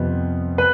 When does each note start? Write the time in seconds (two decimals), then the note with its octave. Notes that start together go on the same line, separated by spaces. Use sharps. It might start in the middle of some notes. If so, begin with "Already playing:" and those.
Already playing: F2 C3 F3 B3
0.58 B4